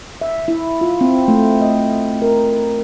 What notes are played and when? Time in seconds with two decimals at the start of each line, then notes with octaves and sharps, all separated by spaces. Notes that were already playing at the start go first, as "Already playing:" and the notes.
0.21 E5
0.48 E4
0.81 F4
1.01 C4
1.28 A3
1.61 D#5
2.22 A#4